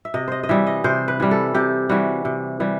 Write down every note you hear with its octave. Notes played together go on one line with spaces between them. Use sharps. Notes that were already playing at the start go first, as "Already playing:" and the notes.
E5
C3 D#5
C5 D#5
D#5
E3 G3 E5
D#5
C3 C5
B4
E3 G3
A4
C3 G4
E3 G3 F#4
C3
E3 G3